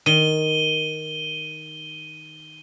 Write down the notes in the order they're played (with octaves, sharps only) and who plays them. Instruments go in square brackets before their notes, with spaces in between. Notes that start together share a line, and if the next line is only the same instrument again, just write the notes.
[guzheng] D#3 [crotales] D#7 G7